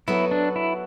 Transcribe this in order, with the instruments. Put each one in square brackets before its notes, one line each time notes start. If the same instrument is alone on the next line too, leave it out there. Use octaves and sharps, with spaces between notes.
[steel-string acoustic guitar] F#3 B3 F#4 A4 [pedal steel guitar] E4
[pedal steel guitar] D4
E4